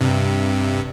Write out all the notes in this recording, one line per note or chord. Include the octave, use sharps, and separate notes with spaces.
G2 C3